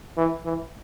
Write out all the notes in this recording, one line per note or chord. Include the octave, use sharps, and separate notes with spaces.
E3
E3